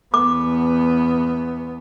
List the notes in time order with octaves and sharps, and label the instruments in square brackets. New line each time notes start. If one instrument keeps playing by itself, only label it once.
[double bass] E2 B3 [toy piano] D6